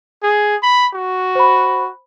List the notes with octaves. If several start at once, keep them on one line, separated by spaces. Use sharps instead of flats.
G#4
B5
F#4
C5 B5